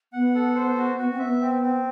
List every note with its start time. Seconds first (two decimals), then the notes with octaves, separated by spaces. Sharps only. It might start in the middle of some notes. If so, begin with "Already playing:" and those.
0.13 B3 F#5
0.35 A4
0.55 C5
0.77 F#4
0.98 B3 F#4
1.10 C4
1.19 B3 E5
1.41 C4
1.62 C4